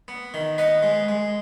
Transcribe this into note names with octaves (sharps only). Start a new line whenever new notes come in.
B3
D#3
B3 B4 D#5
G#3
G#3